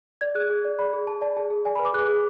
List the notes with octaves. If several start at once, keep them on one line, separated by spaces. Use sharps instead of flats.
D5 G#6
G#4 F#6
G#4
D5
D5 B5
G#4
G#4 A5
D5 A5
G#4 A5
G#4
D5 G#5
B5
B4
D6
G#4 F#6
G#4